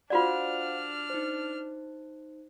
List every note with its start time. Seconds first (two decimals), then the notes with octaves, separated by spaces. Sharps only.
0.10 D4 F4 F#4 C5 D5 F5 F#5 F6
1.10 D#4 C5